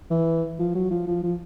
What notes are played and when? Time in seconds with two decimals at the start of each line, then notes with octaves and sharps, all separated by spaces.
0.11 E3
0.59 F3
0.75 F#3
0.91 F3
1.07 F3
1.24 F3